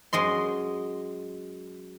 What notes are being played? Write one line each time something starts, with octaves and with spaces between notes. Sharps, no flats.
F#2 G#3 D#5 C6